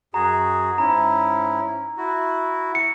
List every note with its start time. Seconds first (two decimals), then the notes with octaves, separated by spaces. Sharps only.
0.14 F#2 F#4 G#4 A#5
0.78 G#2 C#4 E4 A#5
1.97 E4 F#4
2.75 C#7